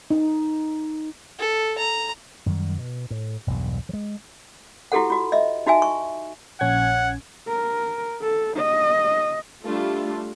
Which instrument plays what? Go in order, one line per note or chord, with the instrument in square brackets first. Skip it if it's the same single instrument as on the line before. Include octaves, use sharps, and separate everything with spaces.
[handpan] D#4
[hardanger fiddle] A4
A#5
[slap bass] F#2 D#3 G3
B2
A2
E1 B1 E2 G2
F3 G#3
[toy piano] E4 F#4 G4 A4 F#5
F4 F#4
D#5 E5
D#4 F#4 E5 G#5
C#6
[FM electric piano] A#1 C#4 G#6 [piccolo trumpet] F#5
[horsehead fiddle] A#4
A4
D#5
[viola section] G3 A3 D4 F4